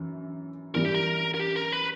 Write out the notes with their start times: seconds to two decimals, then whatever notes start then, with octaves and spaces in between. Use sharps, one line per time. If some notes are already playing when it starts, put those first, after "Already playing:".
Already playing: F#2 E3
0.75 F#2 E3 G3 A#4
0.85 G4
0.94 A#4
1.35 A#4
1.40 G4
1.56 A#4
1.72 B4